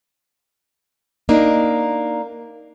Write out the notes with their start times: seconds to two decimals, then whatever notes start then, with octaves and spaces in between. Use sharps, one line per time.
1.29 A#3 D4 D#4